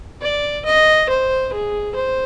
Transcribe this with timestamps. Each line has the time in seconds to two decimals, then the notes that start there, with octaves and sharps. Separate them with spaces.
0.22 D5
0.65 D#5
1.10 C5
1.52 G#4
1.95 C5